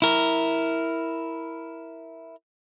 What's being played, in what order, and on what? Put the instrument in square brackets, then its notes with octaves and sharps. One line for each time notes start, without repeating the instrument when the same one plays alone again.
[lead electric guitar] E4 A#4